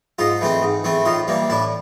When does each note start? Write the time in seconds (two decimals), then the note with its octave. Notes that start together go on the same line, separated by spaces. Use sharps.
0.19 G#2 D#4 F4
0.41 E3 A3 C4
0.63 G#2
0.84 E3 A3 C4
1.05 A2 D#4 F4
1.28 E3 G3 A#3
1.50 A2 D4 E4